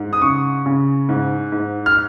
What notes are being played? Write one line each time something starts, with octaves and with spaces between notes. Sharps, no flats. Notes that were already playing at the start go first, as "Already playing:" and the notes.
Already playing: G#2
D#6
C#3 C#6
C#3
G#2
G#2
F6